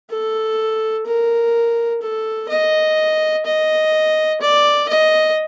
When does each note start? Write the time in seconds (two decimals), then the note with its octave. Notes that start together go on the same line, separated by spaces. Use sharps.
0.10 A4
1.06 A#4
2.02 A4
2.49 D#5
3.46 D#5
4.41 D5
4.89 D#5